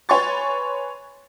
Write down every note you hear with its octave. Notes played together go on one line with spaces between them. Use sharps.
B4 C#5 G#5 C6 C#6 A6